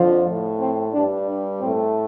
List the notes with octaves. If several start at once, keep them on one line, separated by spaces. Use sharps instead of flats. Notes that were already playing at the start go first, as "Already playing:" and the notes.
Already playing: F2 D3 F3
A2 A3
C4
G2 G3 D4
D4
A2 A3 C4